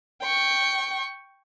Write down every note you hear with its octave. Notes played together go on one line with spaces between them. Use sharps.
G5 C#6